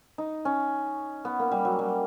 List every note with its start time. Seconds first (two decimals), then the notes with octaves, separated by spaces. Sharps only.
0.18 D#4
0.45 C#4
1.25 B3
1.39 A#3
1.51 G3
1.65 F#3
1.79 G3